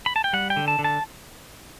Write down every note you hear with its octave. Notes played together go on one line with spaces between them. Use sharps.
B5
A5
G5
G3 F#5
G5
D3
A5
D3
A5